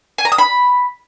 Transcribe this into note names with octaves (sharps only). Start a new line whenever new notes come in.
G#5
A#5
D#6
B5